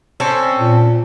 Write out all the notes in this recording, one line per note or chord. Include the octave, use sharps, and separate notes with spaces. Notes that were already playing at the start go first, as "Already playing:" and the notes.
C4 C#4 A4
A#2